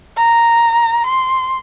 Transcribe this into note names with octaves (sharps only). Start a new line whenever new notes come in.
A#5
C6